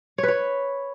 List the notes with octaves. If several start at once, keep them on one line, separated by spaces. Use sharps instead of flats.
C#5
B4
C#5